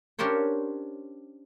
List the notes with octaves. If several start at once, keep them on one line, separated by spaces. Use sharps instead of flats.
C#4 D4 G4 A#4 C5 C#5